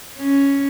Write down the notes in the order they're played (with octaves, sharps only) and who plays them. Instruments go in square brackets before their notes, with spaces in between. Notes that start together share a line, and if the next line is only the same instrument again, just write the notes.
[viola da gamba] C#4